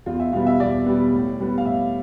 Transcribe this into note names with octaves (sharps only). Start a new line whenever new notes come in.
E2 F4
E5
B2 G3 B3 F5
E5
E2 D5
B2 G3 B3
A2
G3 B3
F5
A2 E5